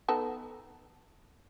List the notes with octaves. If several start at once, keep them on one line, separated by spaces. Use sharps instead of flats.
B3 D#4 A4